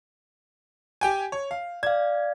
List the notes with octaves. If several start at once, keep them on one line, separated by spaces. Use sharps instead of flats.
G4 G5 G#5
C#5
F5
D5 F5 G#6